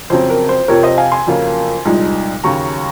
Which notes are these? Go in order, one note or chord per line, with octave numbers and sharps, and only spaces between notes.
F2 C#3 F#3 C4 C5
A#4
C5
F2 C3 F3 A#4 C#5
C5 D#5
F5 G#5
G#5 C6
F2 C#3 F#3 A#3 F4
C2 A#2 F3 G#3 D#4
D#2 C#3 F#3 A#5 C#6